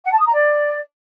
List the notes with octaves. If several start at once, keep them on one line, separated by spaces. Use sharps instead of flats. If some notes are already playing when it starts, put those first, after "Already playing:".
F#5
A5
D#6
A#5
D5